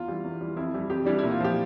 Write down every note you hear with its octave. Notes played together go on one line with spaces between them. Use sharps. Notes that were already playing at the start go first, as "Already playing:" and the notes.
Already playing: E2 F4
E3 G3
E2
E3 G3
F2 E4
E3 G3
F2 G4
E3 G3 D4
A#2 E4
F4
F3 G4